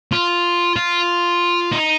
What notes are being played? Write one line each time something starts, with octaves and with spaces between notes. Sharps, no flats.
F4
F4
D#4